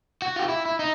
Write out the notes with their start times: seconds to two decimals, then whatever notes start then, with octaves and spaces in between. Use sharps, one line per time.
0.22 F#4
0.36 F4 G4
0.48 E4
0.66 E4
0.79 D#4